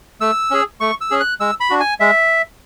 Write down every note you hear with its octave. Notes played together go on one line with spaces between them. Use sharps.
A3 E6
C#4 G#4
A3 C#6
E6
C#4 G#4
F#6
G#3 E6
B5
D4 F#4
G#5
G#3 E5